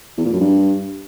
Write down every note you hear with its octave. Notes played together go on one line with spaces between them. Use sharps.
E2
A#2
F#2
G2